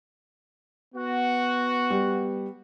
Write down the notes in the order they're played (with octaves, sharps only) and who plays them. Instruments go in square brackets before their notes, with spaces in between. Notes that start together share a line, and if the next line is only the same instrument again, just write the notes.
[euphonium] B3 [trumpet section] F#4
[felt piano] G3